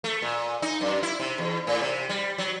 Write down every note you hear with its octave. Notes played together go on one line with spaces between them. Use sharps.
A3
A#2
D#4
F#2
E4
C3
E2
A2
C3
G3
F#3